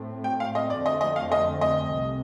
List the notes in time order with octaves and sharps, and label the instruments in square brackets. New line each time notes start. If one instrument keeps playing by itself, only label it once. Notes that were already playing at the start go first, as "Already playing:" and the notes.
Already playing: [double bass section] A2 A3 C4
[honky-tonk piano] G5
F5
D#5
[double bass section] F2 D3 A3 C4 [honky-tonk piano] D5
[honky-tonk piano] D#5
D#5
F5
D#5
D#5
[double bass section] C2 C3